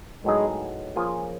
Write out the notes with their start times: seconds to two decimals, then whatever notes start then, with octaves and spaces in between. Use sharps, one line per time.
0.24 A2 F#3 G#3 B3 D#4 G#4
0.96 F3 A#3 C#4 F4 G#4